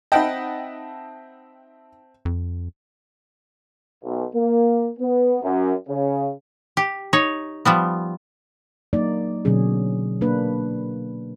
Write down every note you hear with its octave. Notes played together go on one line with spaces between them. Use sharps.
C4 D#4 D#5 E5 F#5 G5 A5 B5
F2
B1
A#3
B3
F#2
C#3
G4
D#4 C#5
F3 G3 B3
F#3 A#3 D#4 D5
B2 D3 F#3 C#4 G#4
A#3 D4 B4